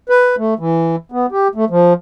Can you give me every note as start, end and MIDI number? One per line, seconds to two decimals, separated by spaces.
0.09 0.36 71
0.38 0.54 57
0.59 0.96 52
1.12 1.26 59
1.32 1.48 67
1.55 1.65 57
1.70 1.93 53